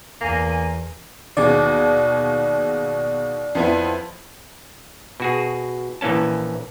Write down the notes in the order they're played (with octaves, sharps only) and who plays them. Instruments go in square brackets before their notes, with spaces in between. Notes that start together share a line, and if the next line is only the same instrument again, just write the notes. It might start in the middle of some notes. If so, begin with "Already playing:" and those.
[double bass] E2 [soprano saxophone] A#3 [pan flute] G#5
[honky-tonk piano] D#2 B2 G#4 [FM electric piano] D5
[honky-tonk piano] F2 B3 E4
[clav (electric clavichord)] B2 F#4 G#4
A#1 E3 A#3 C#4 A5